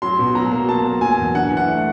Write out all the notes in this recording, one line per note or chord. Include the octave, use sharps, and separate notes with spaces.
F#3 C6
B2
F#3 A#5
A#3
F#3 A5
A#3
F#3 G#5
E2
D4 F#5
E3
F#5
A3